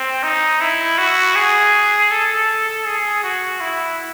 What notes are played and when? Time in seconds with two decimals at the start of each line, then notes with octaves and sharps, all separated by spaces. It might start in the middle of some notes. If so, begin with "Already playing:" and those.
Already playing: C4
0.23 D#4
0.61 E4
0.98 F#4
1.35 G#4
2.11 A4
2.85 G#4
3.23 F#4
3.60 E4